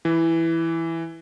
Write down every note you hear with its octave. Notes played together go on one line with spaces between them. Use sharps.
E3